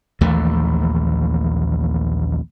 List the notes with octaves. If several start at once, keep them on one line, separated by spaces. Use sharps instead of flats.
A#1 D#2 E3 A3